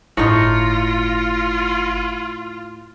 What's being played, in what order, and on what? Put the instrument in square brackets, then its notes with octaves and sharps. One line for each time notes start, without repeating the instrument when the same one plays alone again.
[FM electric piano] G1 A#6 C#7 [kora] A2 D#4 [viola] F4